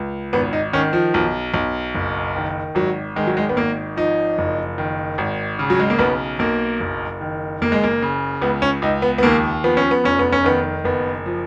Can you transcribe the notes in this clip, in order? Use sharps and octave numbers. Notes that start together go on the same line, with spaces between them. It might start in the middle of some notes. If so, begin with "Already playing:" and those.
Already playing: C#2
G#1 B3
D#4
D#3 C#4
F3
B1
B1
F#1
D#3
G#1 F#3
D#3 G#3
F#3
G#3
B3
G#1 A#3
F3 D#4
F#1
D#3
G#1
C#3
F#3
G#3
A#3
B1 B3
B1 A#3
F#1
D#3
F#1 A#3
G#3
A#3
C#3
C#2 B3
C#4
C#2 D#4
B3
B3
D#2 A#3
F3 B3
C#4
B3
F1 C#4
B3
C#4
D#3 B3
F#1 B3
F3